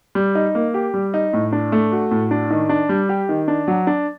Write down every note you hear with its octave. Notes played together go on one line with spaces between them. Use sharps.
G3
D#4
A#3
G4
G3
D#4
A2
D4
A3
F#4
A2
D4
D#3
D4
G3
G4
D#3
D4
F#3
D4